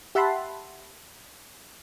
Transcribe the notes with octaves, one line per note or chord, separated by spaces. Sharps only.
G4 E5 F#5 A5 B5 C6